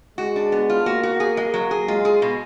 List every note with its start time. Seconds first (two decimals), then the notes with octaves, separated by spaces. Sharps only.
0.18 G#3 F#4
0.36 D4
0.52 B3
0.69 F4
0.86 A#3 F#4
1.03 F#4
1.20 G#4
1.37 G#3
1.54 F#3
1.71 G#4
1.88 G#3 F4
2.05 G#4
2.22 B2